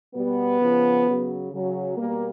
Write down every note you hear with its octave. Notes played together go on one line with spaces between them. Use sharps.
B2 G3 B3
C#3 F3
C#3 F#3
C#3 F#3
B2 G3 A#3